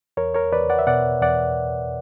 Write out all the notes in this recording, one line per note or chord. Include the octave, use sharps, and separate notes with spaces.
E2 A#4 C#5
A#4 C#5
E2 B4 D5
D5 F#5
E5
B2 D5 F#5
E2 D5 F#5